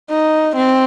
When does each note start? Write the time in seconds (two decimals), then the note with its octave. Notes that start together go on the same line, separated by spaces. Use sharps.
0.10 D#4
0.56 C4